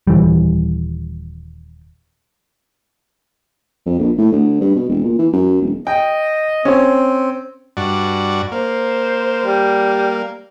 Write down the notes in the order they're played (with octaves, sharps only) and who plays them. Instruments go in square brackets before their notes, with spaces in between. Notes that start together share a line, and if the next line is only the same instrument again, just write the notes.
[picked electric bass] D#1 E3 G3
[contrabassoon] F2
A#1
A2
D2
G2
B2
E1
A#2
E3
F#2
E1
[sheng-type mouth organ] D#5 [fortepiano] G5
[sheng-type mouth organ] C4 [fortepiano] C#4 C#5
[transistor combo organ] G2 F#4 D5
[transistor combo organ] A#3 [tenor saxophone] C5
[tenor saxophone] G3